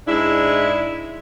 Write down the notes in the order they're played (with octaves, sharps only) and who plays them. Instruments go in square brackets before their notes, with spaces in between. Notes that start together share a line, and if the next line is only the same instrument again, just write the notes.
[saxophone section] G#2 G#3 D4 E4